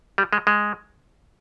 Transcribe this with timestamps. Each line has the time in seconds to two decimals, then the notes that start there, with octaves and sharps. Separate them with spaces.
0.18 G3
0.33 G#3
0.47 G#3